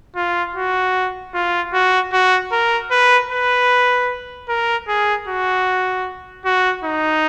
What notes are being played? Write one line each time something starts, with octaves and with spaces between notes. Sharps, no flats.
F4
F#4
F4
F#4
F#4
A#4
B4
B4
A#4
G#4
F#4
F#4
D#4